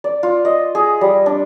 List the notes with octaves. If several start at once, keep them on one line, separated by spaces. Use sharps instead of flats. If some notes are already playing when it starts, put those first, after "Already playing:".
D5
F4
D#5
G#4
G3
D4